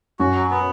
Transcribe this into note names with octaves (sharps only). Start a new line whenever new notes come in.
F#2 F#4
F#3
B3